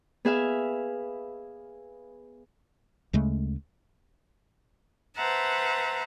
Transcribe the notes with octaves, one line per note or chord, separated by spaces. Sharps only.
B3 G#4 E5 F5
D2 C#3 G#3 A3
B4 C5 E5 F#5 A5 A#5